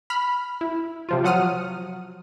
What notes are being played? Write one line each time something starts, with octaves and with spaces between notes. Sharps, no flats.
B5 F6
E4
C3 F3 F4
F3 F#3 F#5 D#6 F6 D#7